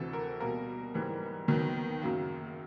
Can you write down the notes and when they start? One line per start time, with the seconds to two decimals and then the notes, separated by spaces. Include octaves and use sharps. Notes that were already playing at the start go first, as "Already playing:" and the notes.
Already playing: D2 C3 E3 A4
0.13 A#4
0.40 B2 G3 A#3 A#4
0.94 G#2 E3 G3
1.48 D#2 D#3 F#3 B3
2.02 F#2 C#3 F#3 A#3